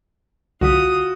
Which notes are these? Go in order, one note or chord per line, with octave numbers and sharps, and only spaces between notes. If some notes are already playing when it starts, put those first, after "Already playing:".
C2 D3 F4 F#4 D#6 B6